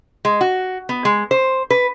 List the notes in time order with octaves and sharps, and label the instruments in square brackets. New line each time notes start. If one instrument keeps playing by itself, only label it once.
[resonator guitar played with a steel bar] G#3
F#4
B3
G#3
C5
B4